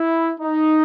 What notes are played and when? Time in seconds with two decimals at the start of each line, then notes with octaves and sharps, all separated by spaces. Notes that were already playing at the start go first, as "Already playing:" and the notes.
Already playing: E4
0.40 D#4